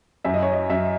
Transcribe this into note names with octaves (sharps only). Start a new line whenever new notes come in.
F#2 E5
D#5
C#5
D#5
F#2 E5